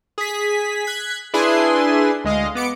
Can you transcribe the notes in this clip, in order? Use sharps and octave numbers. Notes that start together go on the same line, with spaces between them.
G#4 B6
F#6 G#6 B6
D4 E4 G#4 B4 G#5 C6
D2 G#3 D#5 F5
B3 D6 C#7